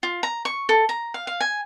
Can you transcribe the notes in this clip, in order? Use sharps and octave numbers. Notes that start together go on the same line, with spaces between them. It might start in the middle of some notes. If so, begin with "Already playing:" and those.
F4
A#5
C#6
A4
A#5
F5
F5
G#5